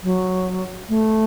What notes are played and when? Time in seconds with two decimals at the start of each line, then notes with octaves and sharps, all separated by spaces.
0.03 F#3
0.89 A3